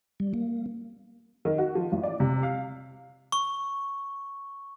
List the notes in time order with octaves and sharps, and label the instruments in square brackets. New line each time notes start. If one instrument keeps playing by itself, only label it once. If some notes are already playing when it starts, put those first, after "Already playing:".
[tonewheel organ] G3
A#3
[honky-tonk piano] D#3
F#4
F3
A1
D5
C3
F5
[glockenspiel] C#6